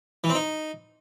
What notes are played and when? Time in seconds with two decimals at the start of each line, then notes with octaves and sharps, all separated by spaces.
0.24 E3
0.29 C4
0.35 D#4